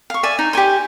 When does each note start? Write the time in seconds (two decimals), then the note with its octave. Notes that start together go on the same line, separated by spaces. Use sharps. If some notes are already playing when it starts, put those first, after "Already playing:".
0.10 F5 C#6
0.23 D5 E5 G#5
0.39 D#4
0.53 G4 D5 G#5 C6